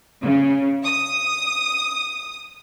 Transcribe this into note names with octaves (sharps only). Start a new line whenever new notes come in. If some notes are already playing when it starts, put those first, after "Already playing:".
C#3
D#6